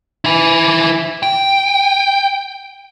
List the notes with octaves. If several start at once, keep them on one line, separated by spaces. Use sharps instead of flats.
E4 G#5
G5